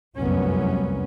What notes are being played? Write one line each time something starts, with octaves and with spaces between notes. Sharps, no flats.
F1 C2 F#2 F#3 B3 C#4